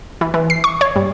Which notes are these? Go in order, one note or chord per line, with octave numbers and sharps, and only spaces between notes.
E3
E3
C7
C#6
C#5
G2